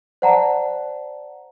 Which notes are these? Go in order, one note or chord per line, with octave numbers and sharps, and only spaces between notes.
C5 D5 F#5 A5 A#5